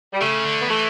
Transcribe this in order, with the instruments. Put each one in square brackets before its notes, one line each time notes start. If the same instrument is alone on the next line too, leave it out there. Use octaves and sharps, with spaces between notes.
[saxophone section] G3
[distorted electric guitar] C#3 [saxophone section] A3
[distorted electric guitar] D3
[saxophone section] B3
[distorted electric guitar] E3 [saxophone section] A3